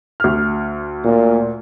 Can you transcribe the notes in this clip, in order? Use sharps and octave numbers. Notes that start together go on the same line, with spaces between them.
D2 F6
A#2